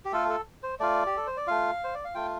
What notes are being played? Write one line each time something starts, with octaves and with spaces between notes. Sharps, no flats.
G4
A3 F4 A4
A4
C5
A3 F4 D5
G4
A4
C5
D5
A3 F4 F5
C5
D5
F5
A3 F4 G5